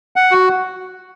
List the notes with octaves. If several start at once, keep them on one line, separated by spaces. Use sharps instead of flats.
F#5
F#4